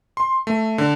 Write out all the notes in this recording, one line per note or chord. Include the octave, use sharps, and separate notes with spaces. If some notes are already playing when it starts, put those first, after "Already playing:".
C6
A3
D3